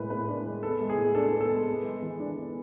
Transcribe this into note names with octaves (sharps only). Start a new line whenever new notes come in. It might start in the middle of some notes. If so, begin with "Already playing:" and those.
Already playing: A2 G#3 B4
A2 B4
D4
G#3
B3 A4
G#3
G#4
A2
D4 A4
B3
A4
G#3
B3
G#3
E3
D4
B3